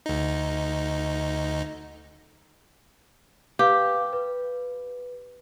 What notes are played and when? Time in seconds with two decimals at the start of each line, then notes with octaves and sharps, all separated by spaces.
0.06 D2 D#4
3.59 G4 B4 F5
4.13 B4